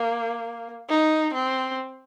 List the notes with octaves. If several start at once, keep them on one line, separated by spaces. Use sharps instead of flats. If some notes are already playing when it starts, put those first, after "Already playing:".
Already playing: A#3
D#4
C4